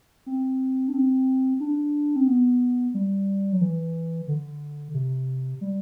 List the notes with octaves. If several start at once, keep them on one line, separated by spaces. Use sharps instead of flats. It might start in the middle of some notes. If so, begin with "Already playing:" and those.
C4
D4
C4
D4
C4
B3
G3
F#3
E3
D3
C3
G3